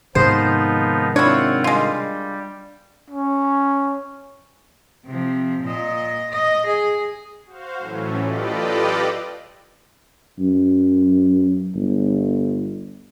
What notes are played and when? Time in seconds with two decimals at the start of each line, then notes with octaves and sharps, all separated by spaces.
0.15 G#2 C3 D#3 F3 B3 D#4 C5
1.16 C4 D4 E4 F4 C#5 F#5
1.64 G3 G#3 F4
3.10 C#4
5.06 C3 F3
5.63 A#2 D#5
6.32 D#5
6.67 G#4
7.46 F#4 C5 F5
7.78 A2 E3 F#3 A3 C#4
8.17 F4 G4 A4 B4 D5 D#5
10.40 F#2
11.75 G1